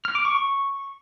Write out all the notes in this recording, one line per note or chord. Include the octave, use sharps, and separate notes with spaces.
F6
D6
C#6
C#6